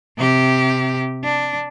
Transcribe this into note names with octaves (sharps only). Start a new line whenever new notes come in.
C3 G4
D4